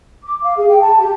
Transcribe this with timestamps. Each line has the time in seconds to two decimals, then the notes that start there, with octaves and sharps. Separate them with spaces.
0.24 D6
0.42 F5
0.57 G#4
0.69 G5
0.81 A5
0.99 G4